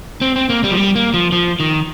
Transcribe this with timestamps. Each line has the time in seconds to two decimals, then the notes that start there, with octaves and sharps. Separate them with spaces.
0.21 C4
0.36 C4
0.50 A#3
0.64 G3
0.71 F3
0.77 G3
0.96 A#3
1.14 F3
1.32 F3
1.60 D#3